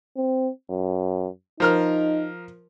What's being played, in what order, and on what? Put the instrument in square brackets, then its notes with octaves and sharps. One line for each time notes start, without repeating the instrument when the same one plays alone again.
[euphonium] C4
F#2
[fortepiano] F3 A#4 F6 [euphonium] D#4